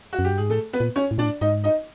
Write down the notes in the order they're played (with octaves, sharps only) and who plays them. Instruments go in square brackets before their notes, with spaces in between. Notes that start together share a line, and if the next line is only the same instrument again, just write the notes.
[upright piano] F#4
[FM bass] F#2
[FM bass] G2 [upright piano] G4
[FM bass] G#2 [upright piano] G#4
[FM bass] A2 [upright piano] A3 A4
[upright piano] B3 B4
[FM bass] A#2
[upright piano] C#4 C#5
[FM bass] A2
[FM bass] A#2 [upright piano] D4 D5
[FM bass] A2
[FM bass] G#2 [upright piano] D#4 D#5
[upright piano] D#4 D#5